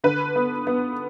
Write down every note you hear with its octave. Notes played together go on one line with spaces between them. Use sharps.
D3 B4
B3
B3